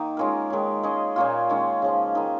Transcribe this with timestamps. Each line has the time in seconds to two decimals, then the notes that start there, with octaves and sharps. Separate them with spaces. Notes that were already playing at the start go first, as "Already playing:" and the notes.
Already playing: D#3 A#3 D#4
0.17 G#3 C#4 F4 A#4
0.50 D#3 G#3 C#4
0.83 G#3 C#4 G#4 D#5
1.16 A#2 A#3 C#4 F4
1.49 D#3 G#3 C#4
1.82 C#3 F3 C#4
2.15 D#3 G#3 D#4